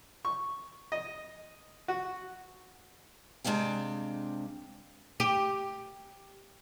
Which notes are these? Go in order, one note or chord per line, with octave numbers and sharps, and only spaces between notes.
C#6
D#5
F#4
C3 G#3 D4 F5 G5
G4